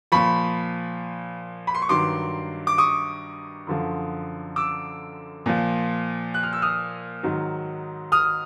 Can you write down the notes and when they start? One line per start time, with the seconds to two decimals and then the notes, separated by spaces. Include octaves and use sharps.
0.12 A#2 F3 B5 C#6
1.67 B5
1.74 C6
1.82 C#6
1.89 G2 D#3 F#3 C6 D6
2.67 D6
2.78 C#6 D#6
3.67 F#2 D3 F3
4.56 D6 E6
5.46 A#2 F3
6.34 F#6
6.43 F6
6.53 E6
6.62 D#6 F6
7.23 G#2 D#3 F#3
8.12 D#6 F6